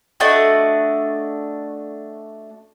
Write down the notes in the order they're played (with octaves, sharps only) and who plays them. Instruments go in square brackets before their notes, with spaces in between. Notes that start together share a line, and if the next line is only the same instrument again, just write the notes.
[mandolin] A3 D4 F#4 D#5